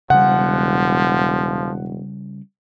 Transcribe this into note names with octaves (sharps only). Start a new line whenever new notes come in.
E1 C#3 F3 G3 F#5